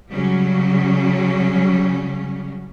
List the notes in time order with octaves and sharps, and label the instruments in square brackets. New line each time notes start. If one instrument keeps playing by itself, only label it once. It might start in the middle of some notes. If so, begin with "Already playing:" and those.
[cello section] C#3 F#3 G3 C#4